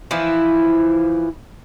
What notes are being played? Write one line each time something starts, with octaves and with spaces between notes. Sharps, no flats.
E3 F3 E4